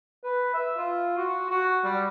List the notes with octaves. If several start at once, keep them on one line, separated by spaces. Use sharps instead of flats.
B4
E5
F4
F#4
F#4
G3